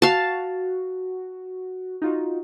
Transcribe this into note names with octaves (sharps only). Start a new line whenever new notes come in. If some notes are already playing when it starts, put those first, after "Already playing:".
F#4 F5 A5
D#4 F4 F#4